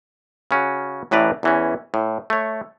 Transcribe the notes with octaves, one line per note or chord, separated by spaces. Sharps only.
C#3 C#4 F#4
A1 A2 E3 B4 D5 A#5
E2 E3 C#4
A2
A3 C#5